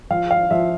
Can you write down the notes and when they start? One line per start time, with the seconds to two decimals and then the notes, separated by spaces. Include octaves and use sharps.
0.11 F3 F5
0.31 F5
0.51 F3 E5